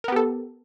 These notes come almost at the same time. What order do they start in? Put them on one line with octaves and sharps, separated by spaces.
A#4 B3 G4 A4